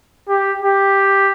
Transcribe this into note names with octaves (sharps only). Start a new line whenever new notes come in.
G4
G4